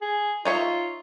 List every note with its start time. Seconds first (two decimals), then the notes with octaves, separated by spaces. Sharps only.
0.02 G#4
0.45 D#4 F4 C#5 E5